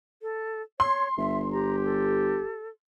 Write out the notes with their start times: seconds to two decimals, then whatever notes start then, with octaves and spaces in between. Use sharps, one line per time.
0.22 A4
0.80 C#5 C6
1.17 G1 E5
1.51 G4 A#5
1.84 A4